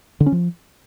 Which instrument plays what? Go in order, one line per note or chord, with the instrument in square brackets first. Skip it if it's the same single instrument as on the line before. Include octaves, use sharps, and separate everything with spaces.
[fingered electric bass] D3
C#4
F3